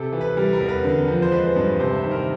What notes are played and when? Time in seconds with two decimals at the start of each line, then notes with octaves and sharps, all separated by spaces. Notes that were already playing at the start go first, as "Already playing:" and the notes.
Already playing: C3 A4
0.13 E3
0.21 B4
0.37 G3 A#4
0.53 A#4
0.61 E2
0.68 B4
0.84 D3
1.08 F3
1.22 C5
1.32 G#3 B4
1.56 G2
1.79 C3 C5
1.95 E5
2.03 D#3
2.11 A#4